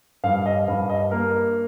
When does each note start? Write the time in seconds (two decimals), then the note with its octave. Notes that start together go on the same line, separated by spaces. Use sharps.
0.24 G2 F5
0.46 D#5
0.68 G2 F5
0.89 D#5
1.11 A#3 A#4